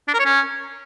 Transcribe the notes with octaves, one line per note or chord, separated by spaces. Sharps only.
D4
A#4
C#5
C#4